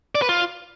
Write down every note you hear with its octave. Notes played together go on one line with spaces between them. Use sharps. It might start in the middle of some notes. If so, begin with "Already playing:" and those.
D5
B4
F4